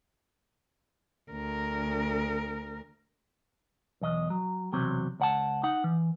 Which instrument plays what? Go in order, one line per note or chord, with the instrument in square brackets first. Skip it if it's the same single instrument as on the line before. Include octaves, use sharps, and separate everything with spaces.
[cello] D2 A#4
[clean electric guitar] B1 E2 D#5
F#3
B1 E2 C3 F#3 C4
C#2 F#5 A5
D#4 F#5
E3